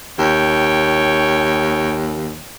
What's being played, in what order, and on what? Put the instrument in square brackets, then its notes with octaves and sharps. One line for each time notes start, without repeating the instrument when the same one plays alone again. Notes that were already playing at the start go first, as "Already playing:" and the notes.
[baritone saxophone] D#2 [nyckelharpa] C#5 G5